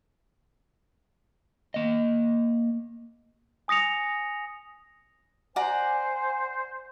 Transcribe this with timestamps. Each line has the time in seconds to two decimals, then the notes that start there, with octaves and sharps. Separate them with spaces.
1.74 A#3 D#5
3.68 G#5 D#6 A#6 C#7 F7
5.56 C5 D5 F#5 G#5 A#5